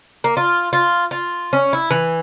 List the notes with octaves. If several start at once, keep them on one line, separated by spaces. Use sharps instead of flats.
A#3
F4
F4
F4
C#4
E4
E3